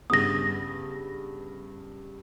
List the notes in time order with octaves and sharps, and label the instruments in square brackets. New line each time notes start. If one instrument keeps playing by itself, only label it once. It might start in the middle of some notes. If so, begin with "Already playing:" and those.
[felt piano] G2 C#3 B3 [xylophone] D#6 A#6